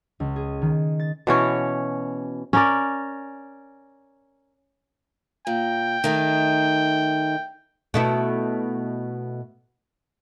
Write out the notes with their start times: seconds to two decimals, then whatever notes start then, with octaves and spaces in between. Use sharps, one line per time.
0.20 C#2
0.36 G#4
0.62 D#3
1.00 A6
1.27 B2 E3 C#4 C#5
2.53 C#4 A#4 D5
5.47 A#2 G5
6.04 D#3 A3 D#4
7.94 B2 A3 E4